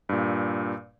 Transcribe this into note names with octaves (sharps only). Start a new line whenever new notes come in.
G2 A#2